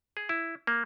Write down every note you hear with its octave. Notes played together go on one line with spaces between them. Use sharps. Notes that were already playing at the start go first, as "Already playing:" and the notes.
G#4
E4
A#3